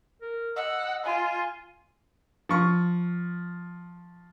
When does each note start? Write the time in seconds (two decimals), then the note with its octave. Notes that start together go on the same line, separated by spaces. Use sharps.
0.21 A#4
0.56 D#5 F#5 E6
1.05 F4 G#5
2.49 F3 C#6